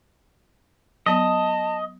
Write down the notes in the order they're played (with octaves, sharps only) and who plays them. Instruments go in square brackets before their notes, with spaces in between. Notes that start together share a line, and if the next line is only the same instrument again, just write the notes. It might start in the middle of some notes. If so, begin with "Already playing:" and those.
[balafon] F#3 B3 [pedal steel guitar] D#5 [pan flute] A5